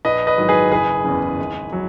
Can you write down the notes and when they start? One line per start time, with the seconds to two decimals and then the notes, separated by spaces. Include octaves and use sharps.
0.05 A#1 B4 D#5
0.27 B4 D#5
0.38 G#2 D#3 F#3
0.49 G#4 B4
0.71 F#1 G#4 B4
1.05 E2 C#3
1.38 G#1
1.73 F#3